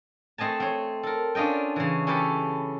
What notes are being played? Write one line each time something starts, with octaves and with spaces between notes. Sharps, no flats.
A3 C4 D#5 G#5 A5
C4 C#5
A4 A#4
C#4 D4 F4 D#5 G5
C#3 E3
C#4 E4 G4 A4 B4